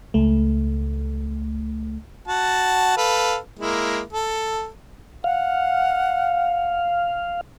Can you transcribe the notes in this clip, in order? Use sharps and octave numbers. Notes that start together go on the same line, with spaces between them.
C#2 A3
F#4 F#5 A5
A4 B4 F5
G#3 A#3 E4
A4
F5 F#5